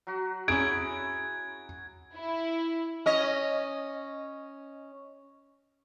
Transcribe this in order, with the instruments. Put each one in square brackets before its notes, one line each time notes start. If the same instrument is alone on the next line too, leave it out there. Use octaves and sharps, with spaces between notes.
[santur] F#3 F#4
[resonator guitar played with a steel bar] C#4 E4 G#4 [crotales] G#6 [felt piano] D7
[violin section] E4
[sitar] C#4 D#5